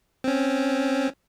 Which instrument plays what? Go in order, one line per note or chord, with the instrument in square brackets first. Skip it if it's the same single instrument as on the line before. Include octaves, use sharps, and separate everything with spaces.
[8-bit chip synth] C4 C#4